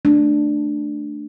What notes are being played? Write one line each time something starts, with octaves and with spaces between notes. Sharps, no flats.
A3 D4